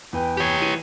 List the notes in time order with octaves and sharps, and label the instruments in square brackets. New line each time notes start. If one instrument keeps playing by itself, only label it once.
[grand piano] E2 B4 G5
[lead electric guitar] G4 C#5
[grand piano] E3 D#7